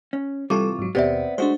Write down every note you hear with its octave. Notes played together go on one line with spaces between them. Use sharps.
C#4
C3 E3 G3 F4 A4 C#6 D6
G#2 F#3
D#2 B2 B3 C4 G4 C5 D5 E5
G#3 A3 D4 F#4 C5